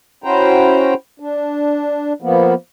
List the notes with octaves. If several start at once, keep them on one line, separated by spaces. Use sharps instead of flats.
C#4 E4 F#4 C5 G5 A#5
D4
F3 A#3 B3